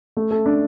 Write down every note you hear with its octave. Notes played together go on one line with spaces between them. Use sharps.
A3
A4
D4